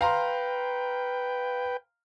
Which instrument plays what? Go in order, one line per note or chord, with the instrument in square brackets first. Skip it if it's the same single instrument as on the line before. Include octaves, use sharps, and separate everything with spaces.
[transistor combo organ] B4 G5 [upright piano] F5 A#5 C6